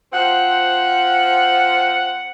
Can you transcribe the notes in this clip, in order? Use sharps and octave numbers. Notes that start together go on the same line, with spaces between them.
F3 C4 F#5